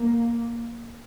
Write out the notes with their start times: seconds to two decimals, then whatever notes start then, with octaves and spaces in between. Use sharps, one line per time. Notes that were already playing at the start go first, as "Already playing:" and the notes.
Already playing: A#3